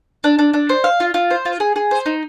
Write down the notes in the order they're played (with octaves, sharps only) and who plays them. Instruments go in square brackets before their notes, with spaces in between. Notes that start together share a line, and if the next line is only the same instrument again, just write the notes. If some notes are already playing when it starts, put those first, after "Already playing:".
[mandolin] D4
D4
D4
C5
F5
F4
F4
C5
F4
G#4
G#4
C5
D#4